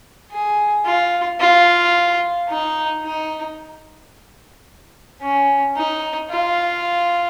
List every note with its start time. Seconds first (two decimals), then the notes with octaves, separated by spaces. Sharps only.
0.32 G#4
0.86 F4
1.40 F4
2.49 D#4
3.04 D#4
5.22 C#4
5.77 D#4
6.31 F4